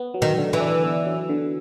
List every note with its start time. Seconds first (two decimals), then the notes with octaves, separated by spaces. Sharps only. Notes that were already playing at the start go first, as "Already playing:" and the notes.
Already playing: B3
0.14 F#3
0.22 D#3
0.38 D3
0.53 E3
0.60 D4
0.84 B3
1.06 F#3
1.29 D3